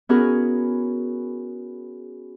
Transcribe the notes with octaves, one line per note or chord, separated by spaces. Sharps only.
B3 C#4 E4 F#4 G#4 A#4